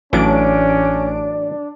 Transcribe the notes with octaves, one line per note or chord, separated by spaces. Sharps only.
A1 A2 E3 F#3 C#4 D4 D7